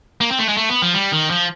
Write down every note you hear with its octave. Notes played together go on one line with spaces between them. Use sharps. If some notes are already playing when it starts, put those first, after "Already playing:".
A#3
C4
A3
G#3
A3
B3
F3
G3
D#3
F3